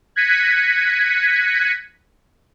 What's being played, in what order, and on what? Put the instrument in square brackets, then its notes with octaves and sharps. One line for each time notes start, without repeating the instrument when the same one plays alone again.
[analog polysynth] F#6 G#6 A#6 B6 C#7 D#7